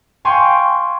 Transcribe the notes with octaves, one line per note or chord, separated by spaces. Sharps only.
F5 G5 G#5 C6 C#6